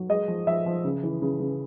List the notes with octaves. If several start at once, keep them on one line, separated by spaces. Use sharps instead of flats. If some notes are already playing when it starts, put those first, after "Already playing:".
Already playing: F#3
G#3 D#5
F3
F3 E5
F3
C#3
E3
C#3
C#3